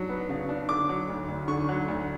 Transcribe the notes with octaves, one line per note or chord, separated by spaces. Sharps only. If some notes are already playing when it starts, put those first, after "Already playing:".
Already playing: F#3 D4
B3
C#3
D4
D3 D6
F#3
D2
D2
D3 C#6
F#3
D2